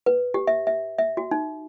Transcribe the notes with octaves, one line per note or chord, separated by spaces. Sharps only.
B4
G4
E5
E5
E5
F#4
D#4